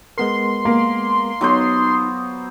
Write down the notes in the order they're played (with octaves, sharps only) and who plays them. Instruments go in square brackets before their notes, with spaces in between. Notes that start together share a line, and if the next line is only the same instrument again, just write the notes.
[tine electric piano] G#3 B3 A#4 [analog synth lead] C6
[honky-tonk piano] A#3
[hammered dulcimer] F#3 B3 C5 [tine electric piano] D#4